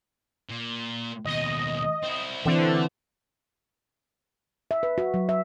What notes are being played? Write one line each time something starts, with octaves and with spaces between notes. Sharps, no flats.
A#2
D#2 B2 D#5
C4 E4
D3 E3 C4 A4 E5
E5
B4
F#4
F#3
E5